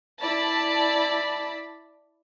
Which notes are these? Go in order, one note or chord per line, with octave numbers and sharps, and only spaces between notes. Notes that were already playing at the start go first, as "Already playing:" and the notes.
E4 D5 A5 B5